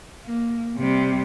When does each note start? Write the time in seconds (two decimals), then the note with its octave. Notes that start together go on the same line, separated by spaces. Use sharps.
0.24 A#3
0.77 C3 G3